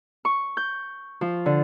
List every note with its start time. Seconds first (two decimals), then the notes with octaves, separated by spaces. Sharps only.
0.25 C#6
0.57 G6
1.21 F3
1.46 D3